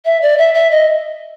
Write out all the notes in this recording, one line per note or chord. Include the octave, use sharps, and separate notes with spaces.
E5
D5
E5
E5
D#5